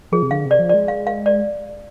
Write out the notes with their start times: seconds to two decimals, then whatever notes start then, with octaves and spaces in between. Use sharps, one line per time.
0.12 F3 G#4
0.22 C3
0.31 D3 F5
0.46 C3
0.51 D5
0.59 F3
0.69 G#3 D5
0.88 F5
1.07 F5
1.26 D5